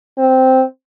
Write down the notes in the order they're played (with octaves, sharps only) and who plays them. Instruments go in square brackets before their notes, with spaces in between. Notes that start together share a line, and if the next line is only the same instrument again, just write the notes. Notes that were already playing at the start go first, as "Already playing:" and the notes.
[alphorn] C4